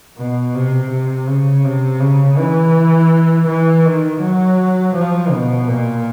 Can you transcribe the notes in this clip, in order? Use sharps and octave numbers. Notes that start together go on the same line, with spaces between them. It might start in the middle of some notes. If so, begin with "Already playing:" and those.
B2
C3
C3
C#3
C3
C#3
E3
E3
D#3
F#3
F3
B2
A#2